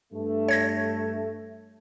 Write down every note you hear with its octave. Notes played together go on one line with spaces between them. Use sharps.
G2 A3
C#5 G#6 A#6